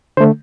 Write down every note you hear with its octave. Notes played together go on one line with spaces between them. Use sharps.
D3 A3 C5